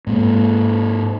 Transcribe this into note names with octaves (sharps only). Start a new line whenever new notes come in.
G#2 A#3